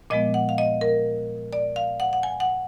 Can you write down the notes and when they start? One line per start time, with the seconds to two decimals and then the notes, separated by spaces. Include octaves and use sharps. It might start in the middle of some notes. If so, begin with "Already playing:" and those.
0.10 A#2 F3 G#3 B3 D#5
0.34 F#5
0.49 F5
0.58 D#5
0.81 A#4
1.53 D5
1.76 F5
2.00 F#5
2.13 F#5
2.23 G#5
2.40 F#5